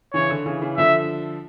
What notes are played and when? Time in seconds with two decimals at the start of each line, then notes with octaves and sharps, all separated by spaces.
0.14 C#3 E3 C#5
0.30 D3
0.46 C#3 E3
0.62 C#3 E3
0.77 D3 F3 E5